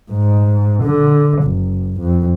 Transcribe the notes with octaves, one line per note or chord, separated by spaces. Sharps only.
G#2
D3
F#1
F2